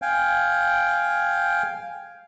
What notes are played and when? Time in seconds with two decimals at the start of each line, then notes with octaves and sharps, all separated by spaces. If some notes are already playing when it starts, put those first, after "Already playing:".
0.02 F5 G5 G#5